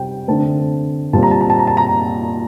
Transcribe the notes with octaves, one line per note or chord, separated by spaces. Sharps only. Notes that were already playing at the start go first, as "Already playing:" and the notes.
Already playing: C3 G3 C4 G5
D3 A3 C4 A5
A#2 G3 C4 A5
A#5
A5
A#5
A5
A#5
A5
A#5